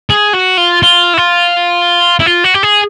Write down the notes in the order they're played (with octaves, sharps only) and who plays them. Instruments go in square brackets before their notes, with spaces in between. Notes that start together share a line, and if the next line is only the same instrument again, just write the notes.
[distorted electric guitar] G#4
F#4
F4
F4
E4
F4
E4
F4
F#4
G4
G#4